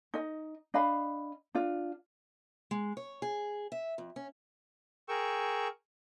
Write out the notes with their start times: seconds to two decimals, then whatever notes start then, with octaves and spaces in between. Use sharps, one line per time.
0.14 D#4 D#5
0.74 D4 D#5 F5 B5
1.55 D4 F4
2.71 G#3
2.97 C#5
3.22 G#4
3.72 E5
3.98 F2
4.16 C#4
5.08 G#4 A#4 G5 C#6 E6